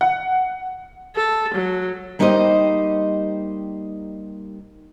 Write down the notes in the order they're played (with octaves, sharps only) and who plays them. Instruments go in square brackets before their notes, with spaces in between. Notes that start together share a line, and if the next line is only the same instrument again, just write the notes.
[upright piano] F#5
[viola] A4
F#3
[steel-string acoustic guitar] G3 A#3 D#4 G4 C5 D#5